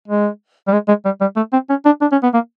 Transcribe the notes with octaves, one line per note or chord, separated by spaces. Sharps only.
G#3
G3
G#3
G#3
G3
G3
A3
C4
C#4
D4
D4
C#4
B3
A#3